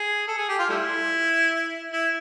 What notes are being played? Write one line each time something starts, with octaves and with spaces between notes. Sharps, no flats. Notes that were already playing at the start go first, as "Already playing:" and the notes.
Already playing: G#4
A4
G#4
G4
F4
G3 A3 E4
E4